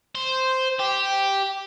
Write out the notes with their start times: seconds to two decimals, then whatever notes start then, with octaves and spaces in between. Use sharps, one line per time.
0.15 C5
0.79 G4